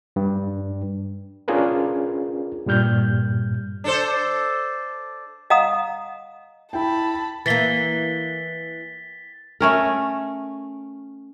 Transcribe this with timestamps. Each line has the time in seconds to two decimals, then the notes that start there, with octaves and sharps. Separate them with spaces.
0.16 G2
1.48 C#4 D4 F4 G#4 A#4 B4
2.66 G2 A#2 G3 F6 G6
3.84 D4 A4 C5
5.50 D#5 F5 F#5 A#5 D#6
6.73 E4 G5 A5 B5
7.46 E3 A#3 A6 B6 G7
9.60 A3 C#4 A#4